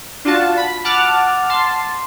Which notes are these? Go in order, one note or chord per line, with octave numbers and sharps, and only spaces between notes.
D4 F4 F#4 A5
B5
F#5 A5 D6 F6
A5 C6